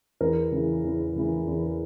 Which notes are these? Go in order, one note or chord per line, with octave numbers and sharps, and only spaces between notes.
E2 A#4
C#3 E3
E2
C#3 E3
E2